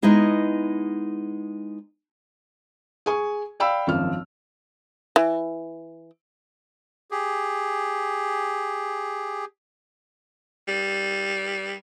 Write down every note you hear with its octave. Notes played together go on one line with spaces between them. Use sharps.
G#3 B3 D#4 E4 G#4
G#4 G#5 C#6
D5 F5 G5 B5 E6
G#1 F#2 F3 F6
E3
G4 G#4
G3